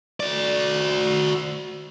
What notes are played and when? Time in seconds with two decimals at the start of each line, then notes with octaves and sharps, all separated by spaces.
0.20 F#4 D5